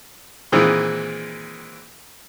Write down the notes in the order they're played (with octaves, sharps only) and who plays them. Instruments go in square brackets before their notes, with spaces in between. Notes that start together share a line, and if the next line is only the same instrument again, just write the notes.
[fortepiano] A#2 D#3 E3 G#3 C4